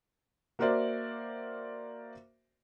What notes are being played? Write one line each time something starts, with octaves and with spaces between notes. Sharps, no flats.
A#3 F#4 A#4 C5 D5 E5